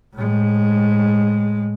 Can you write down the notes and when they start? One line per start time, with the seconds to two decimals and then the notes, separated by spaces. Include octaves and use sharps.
0.15 A2 G#3